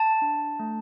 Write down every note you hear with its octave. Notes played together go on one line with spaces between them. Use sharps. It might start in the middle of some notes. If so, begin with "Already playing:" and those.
Already playing: A5
D4
A3